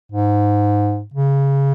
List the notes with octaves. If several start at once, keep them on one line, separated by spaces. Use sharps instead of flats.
G#2
C#3